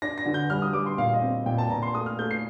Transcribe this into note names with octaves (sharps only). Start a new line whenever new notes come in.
D4 A#6
A#6
D3
G6
G3 F6
D#6
G3 D6
C6
A#2 F5
D#5
C4
A#2 G5
A5
A#2 A#5
C6
A3 D#6
F6
A3 G6
C7